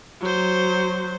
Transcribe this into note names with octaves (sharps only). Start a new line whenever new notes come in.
F#3 C5